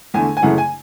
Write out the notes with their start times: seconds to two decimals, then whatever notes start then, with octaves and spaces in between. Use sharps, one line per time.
0.14 E2 D3 A3 G#5
0.37 G#5
0.42 F#2 C#3 E3 A3 F#5
0.58 G#5